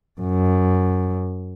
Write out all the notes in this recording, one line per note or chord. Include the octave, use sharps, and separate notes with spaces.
F#2